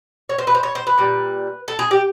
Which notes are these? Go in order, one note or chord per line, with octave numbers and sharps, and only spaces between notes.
C#5
C5
B4
C5
C#5
C5
B4
A#2 G3
A4
G#4
G4